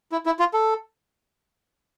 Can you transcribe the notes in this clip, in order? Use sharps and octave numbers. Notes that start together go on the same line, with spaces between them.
E4
E4
F4
A4